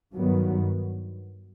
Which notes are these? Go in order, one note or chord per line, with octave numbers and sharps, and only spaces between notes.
G2 D#3 F#3 B3